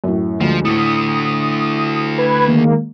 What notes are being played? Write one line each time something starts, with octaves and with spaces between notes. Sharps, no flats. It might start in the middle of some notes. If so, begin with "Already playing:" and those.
F#2 A2
D2 F3 G#3
A2 D3 A3 D#6
B4 B5 G#6
D#3 G#3 A#3